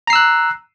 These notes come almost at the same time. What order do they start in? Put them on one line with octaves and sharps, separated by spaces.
A#5 C7 E6 F#6